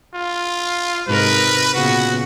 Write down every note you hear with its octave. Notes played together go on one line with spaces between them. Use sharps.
F4
G#2 C3 A#4 B4
A#2 C#3 B3 F#4